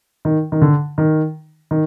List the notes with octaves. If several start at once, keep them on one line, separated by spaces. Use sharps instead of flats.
D#3
D#3
D3
D#3
D#3